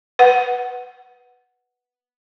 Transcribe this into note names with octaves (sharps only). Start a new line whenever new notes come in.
B4 F#5